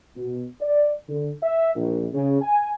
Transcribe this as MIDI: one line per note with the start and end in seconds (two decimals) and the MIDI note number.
0.16 0.43 47
0.60 0.91 74
1.09 1.30 50
1.42 1.72 76
1.74 2.06 34
2.13 2.40 49
2.42 2.70 80